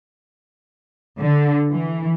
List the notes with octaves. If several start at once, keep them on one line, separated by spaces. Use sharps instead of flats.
D3
E3